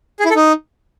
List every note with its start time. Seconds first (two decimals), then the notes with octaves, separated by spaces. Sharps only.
0.20 G#4
0.25 E4
0.30 A4
0.36 D#4